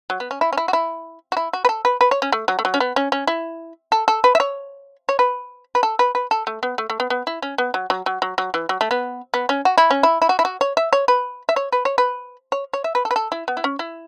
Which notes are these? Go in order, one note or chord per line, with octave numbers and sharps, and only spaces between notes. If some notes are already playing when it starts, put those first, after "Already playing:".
F#3
B3
C#4
E4
C#4
E4
F#4
E4
F#4
E4
F#4
B4
A4
B4
B4
C#5
C#4
A3
F#3
A3
F#3
C#4
B3
C#4
C#4
E4
A4
A4
B4
E5
C#5
C#5
B4
B4
A4
B4
B4
A4
A3
B3
A3
A3
B3
B3
E4
C#4
B3
F#3
F#3
F#3
F#3
F#3
E3
F#3
A3
B3
B3
C#4
F#4
E4
C#4
E4
E4
F#4
E4
F#4
C#5
E5
C#5
B4
E5
C#5
B4
C#5
B4
C#5
C#5
E5
B4
A4
B4
A4
E4
B3
E4
C#4
E4